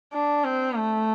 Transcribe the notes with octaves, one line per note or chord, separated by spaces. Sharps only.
D4
C4
A3